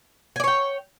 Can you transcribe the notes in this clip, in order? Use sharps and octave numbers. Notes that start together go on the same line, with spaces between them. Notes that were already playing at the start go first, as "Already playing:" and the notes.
C#5 D5 G5 G#5